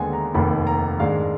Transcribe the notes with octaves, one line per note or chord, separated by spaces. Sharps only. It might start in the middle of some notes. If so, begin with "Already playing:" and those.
Already playing: D#2 D3 G#3 B3 G#5
A#5
F1 D#2 D#3 B5
A#5
G#2 D#3 G#3 D4 F5